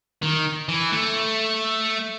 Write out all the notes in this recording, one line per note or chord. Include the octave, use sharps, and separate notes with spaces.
D#3
E3
A3